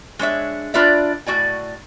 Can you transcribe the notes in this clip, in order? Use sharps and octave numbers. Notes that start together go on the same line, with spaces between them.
G#3 D4 C#5 E5
D4 F4 B4 D5 E5
A2 F#4 D5 G#5